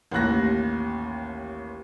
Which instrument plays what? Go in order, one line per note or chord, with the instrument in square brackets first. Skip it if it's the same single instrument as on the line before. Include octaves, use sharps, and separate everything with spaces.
[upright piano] A1 D#2 F#6 A#6